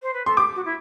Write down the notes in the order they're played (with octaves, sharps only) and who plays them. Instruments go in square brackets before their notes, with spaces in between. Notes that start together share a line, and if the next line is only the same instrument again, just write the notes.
[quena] C5
B4
[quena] A4 [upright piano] C6
[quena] G4 [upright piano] D6
[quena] F#4
E4